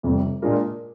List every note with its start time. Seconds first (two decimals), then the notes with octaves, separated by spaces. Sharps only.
0.03 F1 F2 C3 G3
0.42 A#2 G#3 D4 F4 A#4